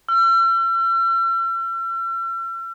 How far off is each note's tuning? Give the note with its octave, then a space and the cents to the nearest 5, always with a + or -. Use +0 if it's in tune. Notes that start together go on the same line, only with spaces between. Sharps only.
E6 +45